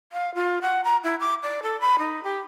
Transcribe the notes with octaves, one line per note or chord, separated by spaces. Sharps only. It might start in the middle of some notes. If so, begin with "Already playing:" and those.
F5
F4
F#5
A#5
E4
D6
D5
A4
B5
D#4
G4